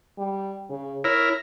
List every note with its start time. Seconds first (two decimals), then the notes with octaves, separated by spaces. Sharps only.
0.18 G3
0.70 C#3
1.04 E4 A#4 C#5